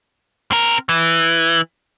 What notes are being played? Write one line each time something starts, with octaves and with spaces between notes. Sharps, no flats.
C4 A#4
E3